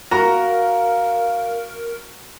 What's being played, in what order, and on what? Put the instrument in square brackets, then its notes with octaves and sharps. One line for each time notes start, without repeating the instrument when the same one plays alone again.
[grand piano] F#4 [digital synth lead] A#4 [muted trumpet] F5 [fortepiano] A#5